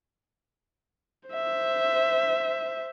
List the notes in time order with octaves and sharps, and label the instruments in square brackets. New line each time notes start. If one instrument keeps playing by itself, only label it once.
[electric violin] C5 E5